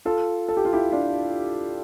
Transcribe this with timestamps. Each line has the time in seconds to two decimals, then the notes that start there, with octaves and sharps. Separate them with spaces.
0.05 F4 A4
0.48 A4
0.57 G4
0.65 F4
0.73 E4 G4
0.92 D4 F4